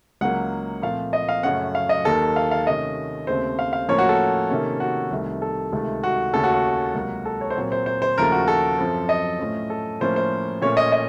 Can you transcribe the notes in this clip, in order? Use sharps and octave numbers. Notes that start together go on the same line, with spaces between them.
C#2 C#3 F#3 A#3 F#5
A#2 F3 A3 C4 F5
D#5
F5
F#2 C#3 A3 C#4 F#5
F5
D#5
D#2 D#3 A#3 A4
F5
F5
C3 D#3 A3 C#4 D#5
D#2 C#3 A3 C4 C5
F5
F5
A2 F3 A#3 C#4 C#5
F#4
A4
C3 D#3 A#3 C#4
F#4
C2 C3 D#3 A3
A4
C#2 C3 D#3 A3
F#4
D#2 C#3 A3 C#4 A4
F#4
F#4
C#2 C3 F#3 A#3
A4
C#5
C5
A#2 F#3 C4 C#5
C5
C5
C5
D#2 C#3 F3 A3 A#4
F#4
A4
F#2 F3 C4
D#5
A2 F3 A3 C#4
A4
A2 F3 A#3 C#4 C5
C5
A#2 A3 C#4 C#5
D#5
D#5